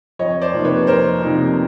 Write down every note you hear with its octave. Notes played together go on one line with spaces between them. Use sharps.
F2 C#5 D#5
C5 D5
C3 F3 A#3 D#4
B4 C#5
F2 A#4 C5
C3 F3 A#3 D#4